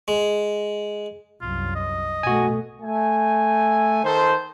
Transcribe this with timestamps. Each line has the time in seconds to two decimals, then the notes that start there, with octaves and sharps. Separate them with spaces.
0.08 G#3
1.41 C2 F#2 F4
1.75 D#5
2.23 B2 A3 F#4 G#5
2.82 A3 G#5
4.04 D#3 A4 C5